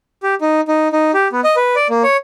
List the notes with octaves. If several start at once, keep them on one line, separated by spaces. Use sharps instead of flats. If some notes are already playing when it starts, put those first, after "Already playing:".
G4
D#4
D#4
D#4
G4
B3
D#5
B4
D5
A#3
C#5